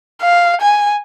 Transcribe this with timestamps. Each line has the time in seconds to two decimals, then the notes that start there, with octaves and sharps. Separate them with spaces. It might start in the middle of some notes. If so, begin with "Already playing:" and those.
0.22 F5
0.61 G#5